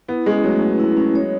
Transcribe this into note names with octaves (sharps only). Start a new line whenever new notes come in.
B3 E4
G#3 C#4
F#3 A3
B4
E4
C#4
C#5